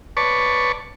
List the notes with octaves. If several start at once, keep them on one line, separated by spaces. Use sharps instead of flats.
B4 C#5 D5 A5 C#6